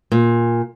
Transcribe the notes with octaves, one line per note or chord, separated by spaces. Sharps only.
A#2